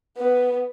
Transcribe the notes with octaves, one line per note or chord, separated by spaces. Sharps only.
B3